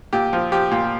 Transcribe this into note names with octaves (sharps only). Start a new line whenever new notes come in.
A#2 G4
F3
F3 G4
A#2